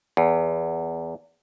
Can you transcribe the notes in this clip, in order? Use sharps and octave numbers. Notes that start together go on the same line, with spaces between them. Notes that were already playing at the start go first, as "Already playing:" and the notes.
E2